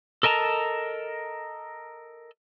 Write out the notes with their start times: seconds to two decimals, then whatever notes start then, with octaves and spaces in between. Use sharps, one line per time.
0.23 A4 A#4 D#5 A5 A#5